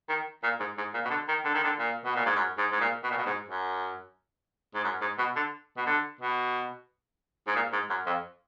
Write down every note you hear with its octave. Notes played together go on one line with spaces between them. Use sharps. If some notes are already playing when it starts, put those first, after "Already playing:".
D#3
A#2
G#2
G#2
A#2
B2
D3
D#3
D3
D#3
D3
A#2
B2
A#2
G#2
F#2
G#2
G#2
A#2
B2
A#2
B2
G#2
F#2
G#2
F#2
G#2
B2
D3
B2
D3
B2
G#2
A#2
G#2
F#2
F2